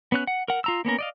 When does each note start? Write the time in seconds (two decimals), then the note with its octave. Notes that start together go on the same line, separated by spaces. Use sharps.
0.12 B3 C#4 F#6
0.27 F#5
0.48 A#4 F#5
0.64 F4 A#5 E6
0.85 A#3 B3 C#4 A#4
0.99 D5 D#5 F5